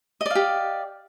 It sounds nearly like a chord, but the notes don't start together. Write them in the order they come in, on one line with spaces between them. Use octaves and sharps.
D#5 D5 F5 G4